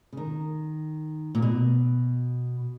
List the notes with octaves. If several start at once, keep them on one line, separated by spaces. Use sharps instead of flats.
C#3
D#3
A#2
B2